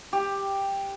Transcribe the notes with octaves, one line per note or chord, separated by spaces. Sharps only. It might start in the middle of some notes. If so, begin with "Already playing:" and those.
G4